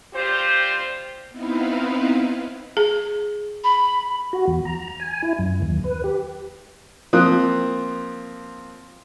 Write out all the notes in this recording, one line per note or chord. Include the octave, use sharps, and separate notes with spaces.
G3 C4 F4 G4 C5
B3 C4 D#4 E4 B4 F5
G#4
B5
F#4
E2
A#5
G#5
E4
F#2
D#2
B4
G4
F3 A#3 C4 D#6 F#6